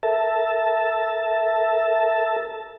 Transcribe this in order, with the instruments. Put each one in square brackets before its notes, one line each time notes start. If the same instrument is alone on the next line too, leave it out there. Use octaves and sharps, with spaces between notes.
[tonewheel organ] A4 A#4 E5 A5